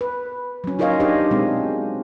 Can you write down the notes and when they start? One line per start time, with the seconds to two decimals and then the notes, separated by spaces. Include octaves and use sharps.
0.01 B4
0.64 F#3 C#4
0.79 D#4 F4 A#4 C#5 D#5 F5
1.00 D4 D#4 G4 C5 D#5
1.31 B2 G#3 C4